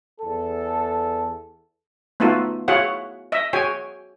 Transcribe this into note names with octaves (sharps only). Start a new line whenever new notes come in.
E2 A4
A3 B3 D#4 F4 F#4 A4
E4 F#4 G#4 C#5 F5 F#5
D#5 E5
F#4 G#4 C#5 G5 G#5